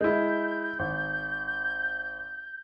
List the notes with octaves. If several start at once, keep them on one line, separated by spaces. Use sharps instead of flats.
G#3 E4 G6
G#1